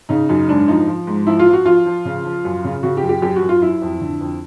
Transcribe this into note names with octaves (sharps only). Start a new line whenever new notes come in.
C#3 D#4
F#2 D#4
G#2 D4
F3 D#4
F3
G#2
F3 E4
F4
F3
F#4
F3 F4
F3
C#3
F3
F#2
C#3
C#3 F#4
G4
F#2
G4
F#2 G4
F#4
F#2
F4
F#3 E4
F2
D3
F2